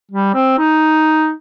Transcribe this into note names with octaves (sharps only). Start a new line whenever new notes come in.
G3
C4
D#4